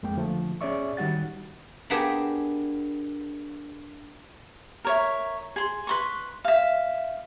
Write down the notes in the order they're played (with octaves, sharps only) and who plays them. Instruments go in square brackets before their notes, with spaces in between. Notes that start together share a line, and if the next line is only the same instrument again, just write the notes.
[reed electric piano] F2 G#3 A#3 G5
D3 F3 A3
C#4 G#4 C#5 D5 E5 C#6
D#3 G3 F#4 F#5 A6
[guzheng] A#3 B3 D4 G4 G#4
[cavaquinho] A#4 C#5 E5
G#4 C6
B4 C6 C#6
E5 F5